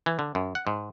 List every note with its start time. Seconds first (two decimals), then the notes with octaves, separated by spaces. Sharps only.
0.06 E3
0.19 D3
0.35 F#2
0.55 F#5
0.67 G#2